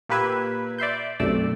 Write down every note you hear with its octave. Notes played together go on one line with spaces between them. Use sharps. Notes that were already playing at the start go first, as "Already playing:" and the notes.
A#2 A#3 G4 B4 E6 G#6
D5 E5 C6 G6
B1 F#2 C3 A3 D5 E6